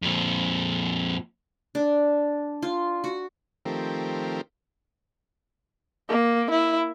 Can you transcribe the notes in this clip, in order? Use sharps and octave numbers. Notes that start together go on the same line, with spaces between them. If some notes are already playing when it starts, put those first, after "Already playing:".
F2 A#2
D4
F4
F#4
D#3 F3 A3 C4 G4 A#4
A#3
E4